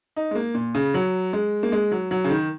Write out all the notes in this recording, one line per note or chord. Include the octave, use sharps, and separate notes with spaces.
D#4
G#3
A#3
A#2
C#3
F#3
G#3
A#3
G#3
F#3
F#3
C#3
D#3